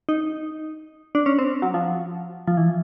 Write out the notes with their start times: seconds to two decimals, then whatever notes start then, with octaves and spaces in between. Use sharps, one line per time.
0.09 D#4
1.15 D4
1.26 C#4
1.39 C4
1.62 F#3
1.74 F3
2.48 F3
2.57 E3